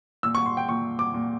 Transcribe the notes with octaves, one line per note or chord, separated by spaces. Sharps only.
A#2 E6
C#6
C6
G5
A#2 C#6
D6
A#2